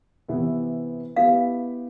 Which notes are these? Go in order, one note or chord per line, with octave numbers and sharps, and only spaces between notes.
C3 E3 B3 E4
B3 E4 G4 F5